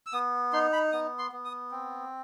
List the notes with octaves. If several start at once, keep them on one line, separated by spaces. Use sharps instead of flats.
E6
B3 D#6
D#4 C6
B5
B3 D#6
C6
B3
D#6
C4